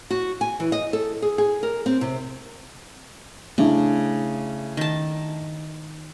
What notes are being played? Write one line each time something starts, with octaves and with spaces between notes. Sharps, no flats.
F#4
G#5
E3
D#5
A4
G#4
G#4
A#4
C4
C3
C#3 A3 D4 E4
D#3 A5